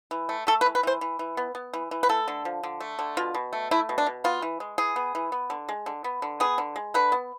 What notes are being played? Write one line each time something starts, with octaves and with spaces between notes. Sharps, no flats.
E3
A3
A3 A4
B4
E3
B4
E3 C5
E3
E3
B3
B3
E3
E3
B4
A3 A4
D3
F3
D3
A3
D3
B2 F4
B2
A3
A3 E4
B2
D4
B2
B3 F4
E3
G#3
E3 G#4
B3
E3
B3
D3
G#3
D3
B3
D3
B3 G#4
D3
G#3
D3 B4
B3